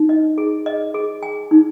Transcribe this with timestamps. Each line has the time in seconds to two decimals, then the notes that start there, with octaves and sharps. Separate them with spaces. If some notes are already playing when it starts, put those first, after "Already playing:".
Already playing: D#4
0.09 D#5
0.38 G#4
0.66 D#5
0.95 G#4
1.23 G#5
1.51 D#4